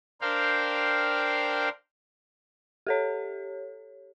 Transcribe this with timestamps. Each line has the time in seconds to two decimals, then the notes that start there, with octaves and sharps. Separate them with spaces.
0.21 D4 A#4 C5 F5 G5
2.87 G4 A4 C#5